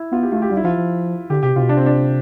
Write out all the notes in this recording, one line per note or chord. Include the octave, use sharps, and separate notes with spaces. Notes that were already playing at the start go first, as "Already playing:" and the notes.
Already playing: E4
B3 F4
G4
A3 F4
G4
G3 F4
E4
F3 F4
F3
D3 G4
C3 G4
C3 F4
B2
C3 D4
C4
D4